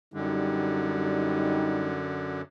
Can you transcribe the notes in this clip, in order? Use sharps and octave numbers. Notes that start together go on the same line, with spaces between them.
F#2 D3 G3 D#4